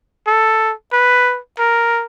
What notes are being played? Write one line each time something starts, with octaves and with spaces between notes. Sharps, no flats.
A4
B4
A#4